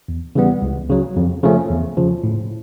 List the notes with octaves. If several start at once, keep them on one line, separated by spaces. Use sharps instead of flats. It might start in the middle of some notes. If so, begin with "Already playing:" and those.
E2
C#3 E3 G3 B3
C#2
C#3 F#3
F2
C#3 F3 A3 C#4
E2
C#3 F3
A2